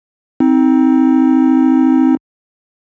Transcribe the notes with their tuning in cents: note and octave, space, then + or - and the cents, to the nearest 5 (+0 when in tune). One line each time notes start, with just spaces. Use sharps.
C4 +0 D#4 +25